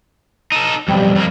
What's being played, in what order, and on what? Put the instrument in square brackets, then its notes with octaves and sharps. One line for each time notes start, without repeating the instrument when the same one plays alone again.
[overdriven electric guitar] D#4 A4
[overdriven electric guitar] B1 F2 [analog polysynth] G3
[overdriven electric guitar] F2 A#3